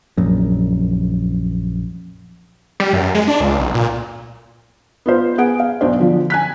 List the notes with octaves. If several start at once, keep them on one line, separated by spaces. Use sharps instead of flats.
A#1 F#2
G3
F#2
G#3
D4
C#2
B1
A#2
B3 F4 C5
B3 G#4 F#5 D7
F5
B1 B2 D4 C5
D3 F3
G#5 F#6 B6